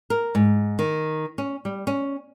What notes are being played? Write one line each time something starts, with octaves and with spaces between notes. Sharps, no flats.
A#4
G#2
D#3
C#4
G3
C#4